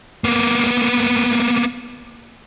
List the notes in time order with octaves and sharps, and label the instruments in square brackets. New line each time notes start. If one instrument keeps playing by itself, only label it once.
[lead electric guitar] A#3 B3